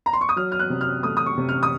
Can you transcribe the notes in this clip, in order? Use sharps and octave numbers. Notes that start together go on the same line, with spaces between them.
A#5
C6
C#6
D#6
F#3 F6
F6
F#6
C3
F6
A3 D#6
D#6
C#6
C3
F6
D#6